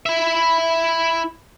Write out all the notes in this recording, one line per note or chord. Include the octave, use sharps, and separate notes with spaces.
E4 E5